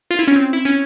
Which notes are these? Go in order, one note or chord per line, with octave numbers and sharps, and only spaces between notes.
F4
E4
C#4
C4
E4
C#4